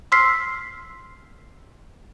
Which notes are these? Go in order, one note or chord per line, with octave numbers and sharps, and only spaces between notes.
C6 E6 F6 B6 C7